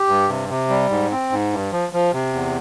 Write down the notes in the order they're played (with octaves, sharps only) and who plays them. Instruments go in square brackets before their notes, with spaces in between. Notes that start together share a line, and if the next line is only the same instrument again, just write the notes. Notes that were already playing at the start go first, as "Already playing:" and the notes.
Already playing: [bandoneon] G4
G2
C3
C3
G3
G#2
C4
G#2
G2
F3
F3
C3
E2